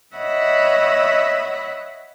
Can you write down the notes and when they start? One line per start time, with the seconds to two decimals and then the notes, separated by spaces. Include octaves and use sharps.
0.16 C#5 D#5 E5 F#5 B5